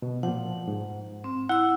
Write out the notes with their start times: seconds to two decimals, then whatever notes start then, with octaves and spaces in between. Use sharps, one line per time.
0.02 B2
0.23 A#2 F3 F#5
0.68 G#2
1.24 C4
1.49 E4 F#5 E6